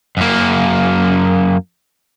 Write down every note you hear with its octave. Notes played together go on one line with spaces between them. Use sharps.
F#2 A#3